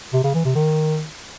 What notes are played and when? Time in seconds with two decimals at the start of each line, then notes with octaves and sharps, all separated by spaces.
0.13 C3
0.24 C#3
0.34 E3
0.45 C3
0.55 D#3